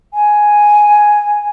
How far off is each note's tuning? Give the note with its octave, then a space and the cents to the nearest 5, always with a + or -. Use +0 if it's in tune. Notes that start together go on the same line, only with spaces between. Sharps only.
G#5 +0